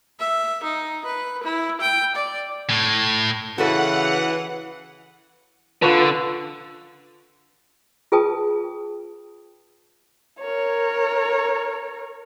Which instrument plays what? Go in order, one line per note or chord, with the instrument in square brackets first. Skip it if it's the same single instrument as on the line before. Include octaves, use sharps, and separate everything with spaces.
[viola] E5
D#4
B4
E4
G5
D5
[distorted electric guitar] A2
[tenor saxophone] C#3 [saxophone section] E3 [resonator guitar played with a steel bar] F#4 A4 B4 [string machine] F#5
[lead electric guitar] D3 [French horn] F4 [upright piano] B4 C#6
[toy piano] F4 G#4 B4 G5 A5 D#6
[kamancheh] A#4 C#5